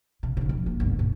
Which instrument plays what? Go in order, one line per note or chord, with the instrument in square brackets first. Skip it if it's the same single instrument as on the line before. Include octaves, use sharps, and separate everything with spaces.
[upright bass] C3
G#1 C#3
F2
A#3
G1 C2
A#2